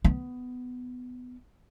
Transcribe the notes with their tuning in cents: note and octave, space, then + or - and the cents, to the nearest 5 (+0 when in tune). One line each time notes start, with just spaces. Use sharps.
B3 +15